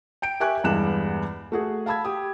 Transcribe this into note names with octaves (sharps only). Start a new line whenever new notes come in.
G5 G6 D7
G4 A#4 E5 G#5 C#6 F#6
E2 G2 G#3 B3 F#6 E7
A3 F#4 G#4
F5 A5 B5 E6 G#6
G4 D#6